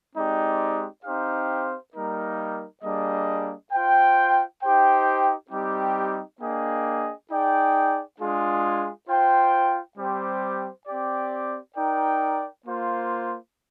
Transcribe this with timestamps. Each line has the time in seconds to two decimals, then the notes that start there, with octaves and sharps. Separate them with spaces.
0.15 G#3 C4 D#4 G4 D5
1.04 C4 D#4 G4 C5 F5
1.94 G3 A#3 D#4 A#4
2.82 G3 A#3 D4 G#4 D#5
3.72 F4 C5 G5
4.61 D#4 G4 C5 G5
5.51 G3 C4 D#4 G4
6.40 A#3 D4 G#4 D#5 G5
7.30 D#4 G#4 D5 G5
8.19 G#3 D4 F4 G#4
9.08 F4 C5 G5
9.97 G3 C4 G4 C5
10.86 C4 G4 D5
11.76 D#4 A#4 D5 G5
12.65 A#3 F4 C5